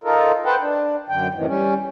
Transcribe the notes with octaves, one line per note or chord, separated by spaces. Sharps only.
D#4 F4 A4 A#4
B4 C5 F#5 G5 A5
D4
F#2 D3 G5
F#2 A2 C3 D#3 E3
G3 C#4